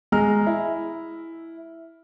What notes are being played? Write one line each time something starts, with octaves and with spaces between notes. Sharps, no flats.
G#3 A#5 F6
E4